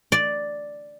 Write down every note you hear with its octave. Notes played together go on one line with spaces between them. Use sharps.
D5